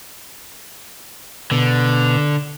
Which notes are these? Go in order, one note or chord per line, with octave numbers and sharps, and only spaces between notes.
B2 D3